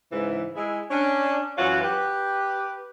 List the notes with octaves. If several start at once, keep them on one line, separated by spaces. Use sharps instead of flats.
G#2 C#3 E3
G#3 E4
C#4 D4
F#2 E3 F4 F#4 C#5
G4 B4